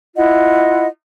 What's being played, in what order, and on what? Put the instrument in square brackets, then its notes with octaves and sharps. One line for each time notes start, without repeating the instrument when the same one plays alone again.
[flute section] E4 F4 D#5 F#5